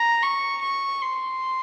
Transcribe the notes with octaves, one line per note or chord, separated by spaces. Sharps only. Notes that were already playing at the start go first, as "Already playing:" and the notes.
Already playing: A#5
C#6
C#6
C6